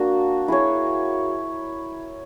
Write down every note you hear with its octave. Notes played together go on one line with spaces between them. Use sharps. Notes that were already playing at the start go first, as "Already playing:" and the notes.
Already playing: A#3 D4 F#4
E4 G#4 C#5